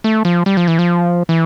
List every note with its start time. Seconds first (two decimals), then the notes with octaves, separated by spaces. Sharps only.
0.04 A3
0.25 F3
0.46 G3
0.57 F3
0.68 E3
0.79 F3
1.29 E3